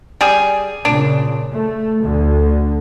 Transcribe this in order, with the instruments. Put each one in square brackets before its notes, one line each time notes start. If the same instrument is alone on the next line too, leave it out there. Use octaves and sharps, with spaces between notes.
[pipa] G3 G#4
[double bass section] A#2 C#3 [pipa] D4
[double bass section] A3
D2 D3